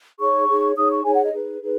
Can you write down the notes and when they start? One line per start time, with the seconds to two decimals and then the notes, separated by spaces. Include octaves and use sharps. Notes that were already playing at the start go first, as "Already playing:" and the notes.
0.19 D#4 G#4 C#5 C#6
0.47 D#4 G#4 C#5
0.76 D#4 G#4 C#5 D#6
0.90 C#6
1.04 D#4 G#4 C#5 G#5
1.14 F#5
1.23 D#5
1.32 D#4 G#4 B4
1.61 D#4 G#4 B4